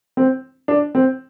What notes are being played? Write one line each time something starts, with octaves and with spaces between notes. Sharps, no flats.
C4
D4
C4